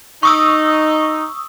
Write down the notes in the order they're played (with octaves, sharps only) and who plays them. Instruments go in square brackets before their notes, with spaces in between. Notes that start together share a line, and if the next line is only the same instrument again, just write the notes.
[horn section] D#4 [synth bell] C#6 D#6 E6